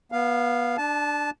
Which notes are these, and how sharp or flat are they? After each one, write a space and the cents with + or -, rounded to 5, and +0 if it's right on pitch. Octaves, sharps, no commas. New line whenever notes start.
B3 -25 F5 +0
D4 +10 A5 -20